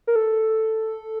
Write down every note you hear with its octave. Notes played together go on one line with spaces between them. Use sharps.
A#4
A4